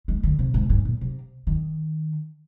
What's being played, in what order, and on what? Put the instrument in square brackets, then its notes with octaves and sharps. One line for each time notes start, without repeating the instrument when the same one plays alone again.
[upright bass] G#3
D3
C3
G#2
G#2
A#2
C3
D#3